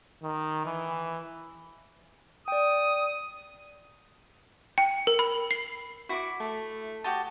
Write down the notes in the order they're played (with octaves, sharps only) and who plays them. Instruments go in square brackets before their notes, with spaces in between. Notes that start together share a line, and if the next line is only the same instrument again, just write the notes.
[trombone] D#3
E3
[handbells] D5 G5 [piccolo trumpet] D#6
[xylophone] G5
A#4
B5
C7
[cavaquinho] E4 D6 [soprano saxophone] F#4
[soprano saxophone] A3
[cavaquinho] F#4 G4 D#6 [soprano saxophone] A5